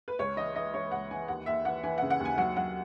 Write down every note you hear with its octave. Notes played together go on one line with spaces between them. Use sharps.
B4
C#2 C#5
E3 D#5
E3 D#5
E3 C#5
C#2 F#5
E3 G#5
D#2 F#5
D#2 E5
E3 F#5
E3 G#5
F#5
C#3
F#5
D#2
G#5
F#3 F#5
F#3 F#5